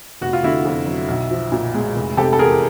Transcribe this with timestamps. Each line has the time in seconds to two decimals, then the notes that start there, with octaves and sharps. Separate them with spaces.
0.21 F1 F#4
0.33 F4
0.43 D3 E4 F#4
0.65 F2
0.86 F#3
1.08 B1
1.31 F3
1.52 A#2
1.74 G#3
1.96 F1
2.17 C3 G4 A4
2.33 A4
2.39 E2 G#4 A#4